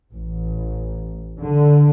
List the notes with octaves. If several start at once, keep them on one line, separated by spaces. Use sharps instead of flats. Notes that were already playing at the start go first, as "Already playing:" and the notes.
A1
D3